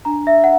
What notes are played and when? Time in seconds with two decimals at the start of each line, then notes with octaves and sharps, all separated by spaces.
0.05 D4 A#5
0.27 E5
0.44 F#5